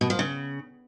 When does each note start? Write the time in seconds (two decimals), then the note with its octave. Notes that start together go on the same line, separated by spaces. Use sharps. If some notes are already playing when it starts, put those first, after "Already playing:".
0.01 B2
0.10 F3
0.19 C#3